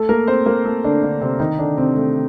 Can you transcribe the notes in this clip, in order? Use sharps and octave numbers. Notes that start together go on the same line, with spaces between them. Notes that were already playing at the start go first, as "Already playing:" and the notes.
Already playing: A3 A4
A#3 A#4
C4 C5
A#3 A#4
A3 A4
D3 D4
D3 D4
C3 C4
D#3 D#4
D3 D4
C3 C4
A3